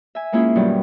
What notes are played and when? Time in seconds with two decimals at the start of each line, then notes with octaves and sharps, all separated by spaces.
0.15 E5 G#5
0.32 G#3 A#3 C#4 E4 F4 G#4
0.55 G2 B2 D#3 F#3 G3